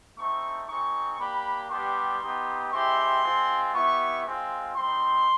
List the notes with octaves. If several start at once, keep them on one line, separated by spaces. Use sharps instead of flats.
A3 C4 D#4 C#6
G#3 C4 D#4 C#6
A#3 D4 G4 B5
G3 B3 D4 G4 C6
B3 D#4 G4
G#3 C4 E4 G4 C6
G#3 C4 F4
B3 E4 G4 C#6
G#3 C4 F4
G3 C4 D#4 C6